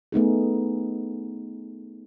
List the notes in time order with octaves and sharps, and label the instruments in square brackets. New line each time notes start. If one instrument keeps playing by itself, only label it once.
[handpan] A3 B3 D#4 G#4